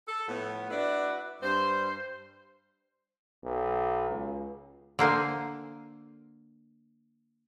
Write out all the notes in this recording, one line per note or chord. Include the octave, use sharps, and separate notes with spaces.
A4
A2 F3 B3
D4 E4 F#4 B4 D5
G2 C5
B1
C#2
D3 A#3 C5 G#5